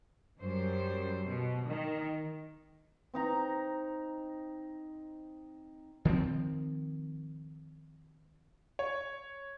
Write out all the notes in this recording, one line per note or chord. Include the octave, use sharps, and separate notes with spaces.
F#2 G3 C5
B2
D#3
C4 D#4 A#5
D#3 F3 A#3 C4
C#5